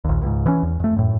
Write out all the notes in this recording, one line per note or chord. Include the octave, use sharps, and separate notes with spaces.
A#1 D#2
C#2 G#2
E3 C#4
E2
F2 A3
F#2 A2